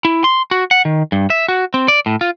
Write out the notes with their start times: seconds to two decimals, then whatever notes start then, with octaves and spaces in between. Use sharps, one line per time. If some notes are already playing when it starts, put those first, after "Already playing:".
0.05 E4
0.24 C6
0.51 F#4
0.71 F#5
0.85 D#3
1.12 G2
1.30 E5
1.48 F#4
1.74 C4
1.88 D5
2.06 A2
2.21 F4